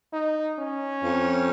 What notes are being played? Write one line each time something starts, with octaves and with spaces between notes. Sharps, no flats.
D#4
C#4
F2